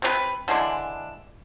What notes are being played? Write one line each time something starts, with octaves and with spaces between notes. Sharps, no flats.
C3 C#4 B4
D3 E3 G#3 D4